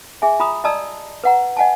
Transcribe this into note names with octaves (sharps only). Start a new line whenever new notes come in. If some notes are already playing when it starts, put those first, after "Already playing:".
G#4 E5 G#5
F4 A#5 B5 D#6
D5 D#5 A5 A#5 D#6 E6
B4 F#5 A#5
D#5 F#5 G#5 A5